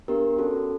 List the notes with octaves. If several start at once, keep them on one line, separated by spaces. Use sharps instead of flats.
B3 D4 G4 A#4
C#4 F#4 A4